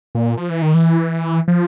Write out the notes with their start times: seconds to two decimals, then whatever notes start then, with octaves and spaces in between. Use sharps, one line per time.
0.15 A#2
0.37 F3
0.50 E3
0.62 D#3
0.74 E3
1.48 F3